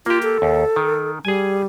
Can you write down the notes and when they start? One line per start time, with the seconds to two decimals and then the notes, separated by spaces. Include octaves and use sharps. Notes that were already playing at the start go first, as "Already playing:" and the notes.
0.06 A#3 F4 G4
0.23 A4
0.42 D#2
0.76 D#3
1.25 G3 G#4 G#5